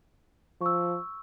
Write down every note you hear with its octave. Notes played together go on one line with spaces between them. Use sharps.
F3 C#6 E6